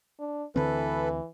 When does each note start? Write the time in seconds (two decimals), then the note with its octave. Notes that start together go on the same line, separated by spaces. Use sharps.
0.19 D4
0.56 D2 D3 E3 C4 A4 B4